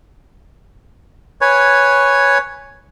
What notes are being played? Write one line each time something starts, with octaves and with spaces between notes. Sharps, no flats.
B4 C#5 G#5